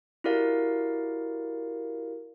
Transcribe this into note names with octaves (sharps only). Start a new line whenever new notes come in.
E4 F#4 G4 A#4 D5 F5